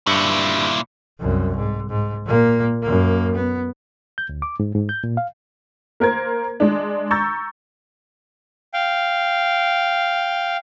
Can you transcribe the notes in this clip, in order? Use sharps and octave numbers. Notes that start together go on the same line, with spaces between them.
G2 A#2 E4 C#7
C2 F#2
G#2
G#2
A#2 A#3
F#2 A#3
B3
G6
D2
D6
G#2
G#2
G6
A#2
F5
A#3 A#4 C5 G#6
G#3 D4
A#5 C#6 E6 G6 A6
F5 G5